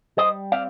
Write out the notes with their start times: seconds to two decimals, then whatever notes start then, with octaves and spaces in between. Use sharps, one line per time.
0.17 G3 C5 D#5
0.52 C4 D5 F5